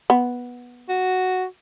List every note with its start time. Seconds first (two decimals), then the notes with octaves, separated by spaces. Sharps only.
0.10 B3
0.89 F#4